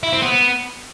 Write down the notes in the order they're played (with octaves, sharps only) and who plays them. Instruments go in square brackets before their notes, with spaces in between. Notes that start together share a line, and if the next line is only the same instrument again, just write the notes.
[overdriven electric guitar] E4
C4
B3